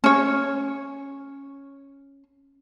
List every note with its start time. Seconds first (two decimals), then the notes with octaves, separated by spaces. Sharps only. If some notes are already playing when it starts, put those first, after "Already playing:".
0.04 C#4 C#5